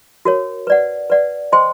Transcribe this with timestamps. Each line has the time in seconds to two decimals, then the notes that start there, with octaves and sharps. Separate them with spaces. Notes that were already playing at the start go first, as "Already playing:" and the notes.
0.25 F#4 A#4 C#5
0.67 B4 D5 F#5
1.10 B4 D5 F#5
1.52 C5 D#5 G5 C6